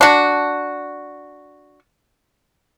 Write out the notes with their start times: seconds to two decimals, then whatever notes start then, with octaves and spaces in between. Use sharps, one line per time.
0.01 D4 F#4